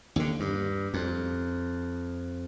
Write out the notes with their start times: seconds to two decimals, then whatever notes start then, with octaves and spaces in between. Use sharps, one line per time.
0.16 D#2 D3
0.40 G2
0.94 F2